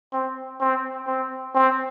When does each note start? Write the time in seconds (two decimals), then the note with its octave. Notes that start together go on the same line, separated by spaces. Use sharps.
0.13 C4
0.60 C4
1.07 C4
1.55 C4